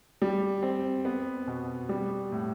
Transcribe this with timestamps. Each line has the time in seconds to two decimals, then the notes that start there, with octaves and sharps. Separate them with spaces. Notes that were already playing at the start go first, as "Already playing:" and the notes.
0.22 G3
0.63 C4
1.05 B3
1.47 B2
1.89 G3
2.32 A2